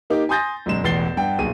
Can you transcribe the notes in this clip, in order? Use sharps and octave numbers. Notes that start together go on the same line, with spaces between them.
A#3 D#4 G4
G#5 C6 D#6 G6 A6 A#6
E1 F#2 G#3 E7
E1 A1 E2 A6 C7 G7
G2 F#5 G5
D#1 B1 G#4 D#7